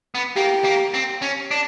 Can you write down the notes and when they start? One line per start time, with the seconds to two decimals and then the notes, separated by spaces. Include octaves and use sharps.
0.15 B3
0.36 A#3 G4
0.64 A#3
0.94 C4
1.22 C#4
1.51 D4